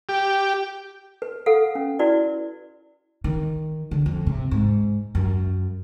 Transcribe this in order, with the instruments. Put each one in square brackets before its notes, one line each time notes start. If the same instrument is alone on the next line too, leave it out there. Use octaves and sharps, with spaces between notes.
[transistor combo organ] G4
[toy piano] B4
A4 B4 F5 F#5
C#4
E4 F#4 B4 D5
[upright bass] D#3
D3
F2
C3
G#2
F#2